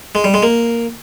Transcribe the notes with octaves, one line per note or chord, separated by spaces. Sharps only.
G#3
G3
G#3
A#3